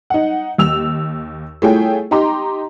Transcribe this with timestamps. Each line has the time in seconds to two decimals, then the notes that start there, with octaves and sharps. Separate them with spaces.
0.10 D#4 F#5
0.58 D#2 E6 F7
1.62 A3 E4 F4 G#4 C#5 G5
2.11 D#4 G4 A#5 C6 D6